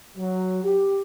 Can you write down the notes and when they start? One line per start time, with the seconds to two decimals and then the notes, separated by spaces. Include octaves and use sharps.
0.17 F#3
0.63 G4